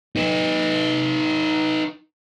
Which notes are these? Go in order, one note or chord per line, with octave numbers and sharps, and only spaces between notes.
D#4 B4